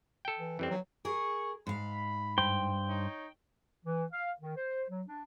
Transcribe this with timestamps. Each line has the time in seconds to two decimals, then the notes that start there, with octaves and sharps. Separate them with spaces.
0.25 A4 G5
0.39 E3
0.59 F2 E3 G3 C4
0.70 F#3
1.05 G#4 A#4 C#6
1.67 G#2 F5 B5
2.38 G2 C5 G5
2.88 D#4 C#5
3.86 E3
4.13 F5
4.41 D#3
4.57 C5
4.90 F#3
5.08 D4